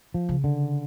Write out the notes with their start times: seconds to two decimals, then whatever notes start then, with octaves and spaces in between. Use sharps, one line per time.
0.14 F3
0.29 C#3
0.44 D3